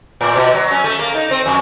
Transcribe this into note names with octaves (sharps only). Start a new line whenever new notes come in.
A2
B2
F#3
C#4
A3
A#3
D#4
C4
F2